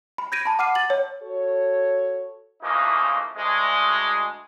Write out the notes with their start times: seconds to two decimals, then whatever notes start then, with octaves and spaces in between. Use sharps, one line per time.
0.18 B5
0.32 G6 G#6 A#6 D7 D#7
0.46 A5 B5
0.59 F#5 D6 F6 C7 D#7
0.75 A6 F#7
0.90 C#5
1.22 F#4 A4 C#5
2.63 C#3 E3 F3 A3 A#3 D#4
3.36 D2 G#3